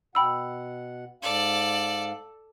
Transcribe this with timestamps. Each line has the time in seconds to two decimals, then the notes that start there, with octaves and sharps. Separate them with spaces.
0.15 B2 F#5 G5 B5 E6
1.23 G#2 A4 D5 F5